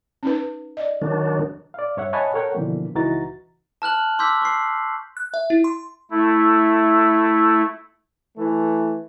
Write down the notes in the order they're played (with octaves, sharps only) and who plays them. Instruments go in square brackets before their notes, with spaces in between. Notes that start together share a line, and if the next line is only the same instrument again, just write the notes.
[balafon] C#4 D#4 B4
D5 D#5
[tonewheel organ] D#3 F#3 D4
[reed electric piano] D5 F5
G2 C#5 E5 F#5
C#5 D#5 F#5 G#5 A5 B5
A4 A#4 C#5 F#5 G5
B2 D3 E3 F3 A#3
C#2 E3 D#4 F#4 A#5 A6
[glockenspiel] A5 F6 F#6 F#7
C6 D6 E6 G6 B6
C#6 C7
[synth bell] F#6
E5
E4
C6
[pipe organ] A3 E4
[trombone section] E3 A3